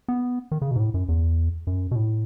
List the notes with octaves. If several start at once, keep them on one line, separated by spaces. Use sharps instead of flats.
B3
D#3
C#3
B2
G#2
A2
F#2
E2
F#2
B2
A2